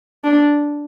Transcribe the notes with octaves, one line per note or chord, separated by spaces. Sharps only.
D4